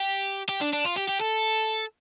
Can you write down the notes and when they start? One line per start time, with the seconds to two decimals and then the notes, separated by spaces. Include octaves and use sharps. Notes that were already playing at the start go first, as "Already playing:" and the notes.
Already playing: G4
0.49 G4
0.61 D4
0.73 D4
0.85 F4
0.97 G4
1.08 G4
1.20 A4